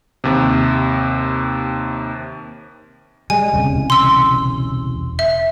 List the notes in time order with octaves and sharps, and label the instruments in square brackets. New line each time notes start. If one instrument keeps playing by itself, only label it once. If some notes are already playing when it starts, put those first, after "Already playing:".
[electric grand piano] D#2 C3
[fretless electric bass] G3 G#3 [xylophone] G#5
[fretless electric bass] E1 C2 C#3
[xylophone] C6 E6
E5